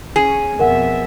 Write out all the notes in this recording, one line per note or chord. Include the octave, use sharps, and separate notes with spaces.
C#4 G#4
F2 B2 A#4 E5 F#5